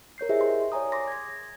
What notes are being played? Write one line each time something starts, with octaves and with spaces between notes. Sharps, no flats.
A#4 C#5 G6 C7
E4 G4 G#4 C5 D#5 E5
C6
C#5 D5 G#5 A#5 D#6
C6 D6 A#6
G#6 A#6